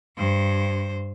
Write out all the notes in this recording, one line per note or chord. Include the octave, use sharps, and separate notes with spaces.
G2 C5